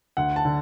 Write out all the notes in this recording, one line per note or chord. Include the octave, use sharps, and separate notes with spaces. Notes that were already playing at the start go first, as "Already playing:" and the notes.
D2 F#5
A5
D3